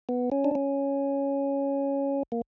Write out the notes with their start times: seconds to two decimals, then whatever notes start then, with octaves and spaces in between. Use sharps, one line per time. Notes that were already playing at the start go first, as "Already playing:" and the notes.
0.09 B3
0.32 C#4
0.44 D4
0.55 C#4
2.32 A#3